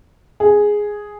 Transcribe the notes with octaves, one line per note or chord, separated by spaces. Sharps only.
G#4